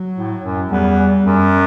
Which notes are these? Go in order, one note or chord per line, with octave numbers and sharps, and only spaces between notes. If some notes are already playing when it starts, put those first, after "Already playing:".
Already playing: F#3
A2
F#2
E2 G3
F#2